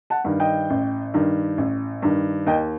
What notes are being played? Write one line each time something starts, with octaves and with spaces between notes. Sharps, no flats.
F#5 A5
G2 D#3
D#5 G5
A1
G2 D#3
A1
G2 D#3
D#2 D#5 G5